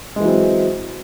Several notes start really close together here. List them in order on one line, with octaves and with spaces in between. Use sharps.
G#3 E3 F#3 C4